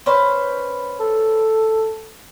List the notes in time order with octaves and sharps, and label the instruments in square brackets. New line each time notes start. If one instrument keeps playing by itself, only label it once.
[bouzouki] C#4 B4 C5
[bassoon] A4